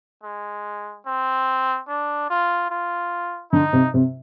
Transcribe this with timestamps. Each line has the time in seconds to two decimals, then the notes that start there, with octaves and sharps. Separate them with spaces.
0.24 G#3
1.06 C4
1.88 D4
2.30 F4
2.70 F4
3.52 D3 D#4
3.73 C3
3.94 C3